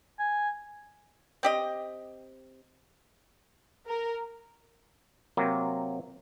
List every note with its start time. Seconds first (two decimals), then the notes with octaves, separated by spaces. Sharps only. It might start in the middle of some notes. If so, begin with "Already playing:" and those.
0.19 G#5
1.43 C4 G4 D#5
3.86 A#4
5.37 C3 F#3 A#3 C4